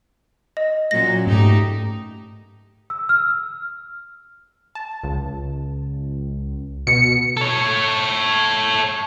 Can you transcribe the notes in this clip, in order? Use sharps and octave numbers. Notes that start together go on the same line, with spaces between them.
D#5
A#2 F#3 C#4 A#6
G#2 A3 D#4 G4
E6
F6
A5
C#2
B2 C#7
A4 C#5